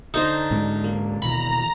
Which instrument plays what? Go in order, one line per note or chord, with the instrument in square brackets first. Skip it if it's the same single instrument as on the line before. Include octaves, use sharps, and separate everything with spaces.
[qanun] D3 C5 A#5 [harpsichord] D#4
[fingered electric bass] G#2 G#3 C#4
[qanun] A#3
[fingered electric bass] D#2 B2 E3 [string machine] A#5 [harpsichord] B5